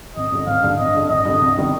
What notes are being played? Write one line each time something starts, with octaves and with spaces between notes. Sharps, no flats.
G#1 D#5
G2 D3
G#1 F5
G2 D3
G#1 D#5
G2 D3
G#1 D#5
G2 D3
C2
C3 D#3 G3 B3